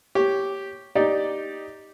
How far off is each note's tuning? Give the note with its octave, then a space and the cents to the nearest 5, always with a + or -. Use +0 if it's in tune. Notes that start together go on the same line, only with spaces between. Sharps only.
G4 -5 C#5 +0
D#4 +0 G4 +0 D5 +0